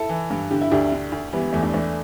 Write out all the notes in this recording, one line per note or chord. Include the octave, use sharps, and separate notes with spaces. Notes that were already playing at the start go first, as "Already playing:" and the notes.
Already playing: E4 A4
E3
G2
D3 G4
E4
D2 D4 G4
D3
D2
E3 G3 B3
G3
E2 A3
A3 D4
E3 A3 D4